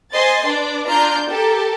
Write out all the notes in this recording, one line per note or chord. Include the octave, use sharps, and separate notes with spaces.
C5 D#5 G#5 C6 A6
D4 B4 D5
D4 F4 A#5 F6 G6
G4 A4 A#4 A5